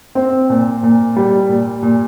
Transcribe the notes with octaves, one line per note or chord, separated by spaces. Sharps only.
C4
A#2
A#2
G3
A#2
A#2